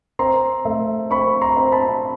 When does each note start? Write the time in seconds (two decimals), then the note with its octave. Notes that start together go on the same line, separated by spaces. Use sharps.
0.19 C4 A#5 C6
0.65 A3
1.11 C4 B5 C#6
1.41 A#5 C6
1.57 C4
1.72 A5 B5